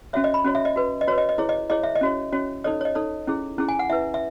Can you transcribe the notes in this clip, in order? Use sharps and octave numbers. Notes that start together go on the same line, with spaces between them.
C#4 F#4 C#5 E5
D#5
B5
C#4 F#4 C#5
E5
D#5
F#4 B4
D#5
F#4 B4 C#5
D#5
D#5
E4 G#4 C#5
D#5
E4 G#4 C#5 D#5
E5
D#5
C#4 F#4 C#5
C#4 F#4 C#5
D#4 A4 C#5 D#5
C#5
D#5
D#4 A4 C#5
C#4 E4 G#4
C#4 E4 G#4
G#5
F#5
E4 B4 E5
E5